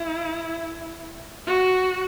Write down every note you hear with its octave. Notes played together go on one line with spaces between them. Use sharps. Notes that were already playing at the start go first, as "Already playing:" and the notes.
Already playing: E4
F#4